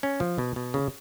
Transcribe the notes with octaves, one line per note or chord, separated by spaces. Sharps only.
C#4
F3
B2
B2
C#3